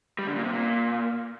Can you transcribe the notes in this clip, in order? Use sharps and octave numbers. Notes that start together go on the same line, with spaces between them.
G3
D3
A#2
C3
A#2